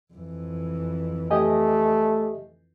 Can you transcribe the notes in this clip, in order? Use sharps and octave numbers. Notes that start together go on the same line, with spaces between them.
F2 E3
A3 G4 D#5 G#5